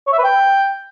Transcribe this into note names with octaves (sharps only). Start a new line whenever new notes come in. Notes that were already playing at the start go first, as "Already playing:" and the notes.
C#5
E5
B4
G5